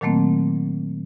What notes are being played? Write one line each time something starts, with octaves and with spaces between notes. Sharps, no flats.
A#2 D#3 F#3 A3 A#3 C4